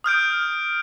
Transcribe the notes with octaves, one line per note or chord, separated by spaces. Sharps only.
D#6 F6 G6 D7